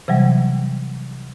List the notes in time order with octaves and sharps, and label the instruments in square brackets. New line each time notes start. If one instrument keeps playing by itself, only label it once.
[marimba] C3 E3 F#3 G3